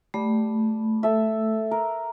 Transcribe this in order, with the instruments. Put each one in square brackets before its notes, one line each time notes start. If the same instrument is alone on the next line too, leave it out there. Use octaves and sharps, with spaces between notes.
[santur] G3 [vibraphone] A3
[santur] A4 E5
A#4